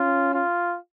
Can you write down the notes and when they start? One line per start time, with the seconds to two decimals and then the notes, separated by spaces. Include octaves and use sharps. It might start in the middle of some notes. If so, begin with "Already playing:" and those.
Already playing: C#4 F4
0.34 F4